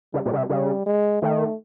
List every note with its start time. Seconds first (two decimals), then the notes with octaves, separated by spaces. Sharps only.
0.13 C#3 G3
0.25 A#2
0.33 C#3
0.38 C3
0.49 C#3 G3
0.86 G#3
1.22 D#3 A3